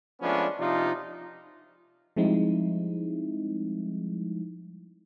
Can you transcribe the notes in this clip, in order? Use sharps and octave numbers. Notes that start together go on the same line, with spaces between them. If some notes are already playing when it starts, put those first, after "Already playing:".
F3 G#3 A3 B3 C#4 D4
C3 F3 D4 D#4 F4
F3 G3 G#3 C4 D#4 E4